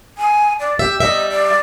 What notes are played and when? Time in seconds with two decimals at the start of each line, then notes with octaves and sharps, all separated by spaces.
0.18 G#5
0.60 D5
0.79 G4 E5
1.00 G3 D#5 E5
1.32 D5